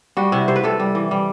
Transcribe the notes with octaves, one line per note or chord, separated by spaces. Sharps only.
G3 F#4
C3 E4
C3 C5
B4
C3 A4
G3
E3
G3